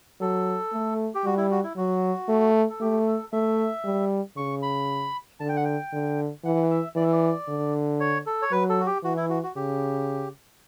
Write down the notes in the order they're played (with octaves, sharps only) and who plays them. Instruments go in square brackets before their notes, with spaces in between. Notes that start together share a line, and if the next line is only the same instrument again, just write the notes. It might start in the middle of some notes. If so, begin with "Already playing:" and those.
[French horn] F#3 [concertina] A4
[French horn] A3
[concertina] G4
[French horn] G3 [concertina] F#4
[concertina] E4
F#4
E4
[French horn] F#3 [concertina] F#4
[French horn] A3
[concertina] A4
[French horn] A3 [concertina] G4
[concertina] A4
[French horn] A3 [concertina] E5
[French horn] G3
[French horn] C#3 [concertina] C#6
[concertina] B5
[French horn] D3 [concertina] A5
[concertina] G5
F#5
G5
[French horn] D3
[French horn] E3 [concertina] F#5
[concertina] E5
[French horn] E3 [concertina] D5
[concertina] E5
D5
[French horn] D3
[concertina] C#5
A4
C#5
[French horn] F#3 [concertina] B4
[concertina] A4
F#4
G4
[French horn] E3 [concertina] F#4
[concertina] E4
F#4
F#4
[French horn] C#3 [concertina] G4